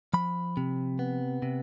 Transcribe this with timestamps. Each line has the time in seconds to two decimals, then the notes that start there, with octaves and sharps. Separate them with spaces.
0.14 F3 B5
0.57 C3
0.99 B3
1.42 C3